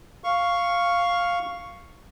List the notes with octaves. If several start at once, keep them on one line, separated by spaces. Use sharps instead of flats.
F5 C#6